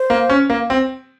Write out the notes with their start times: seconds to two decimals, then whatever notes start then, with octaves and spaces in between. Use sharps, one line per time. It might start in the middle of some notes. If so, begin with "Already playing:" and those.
Already playing: C5
0.10 A#3
0.30 C#4
0.50 A#3
0.70 C4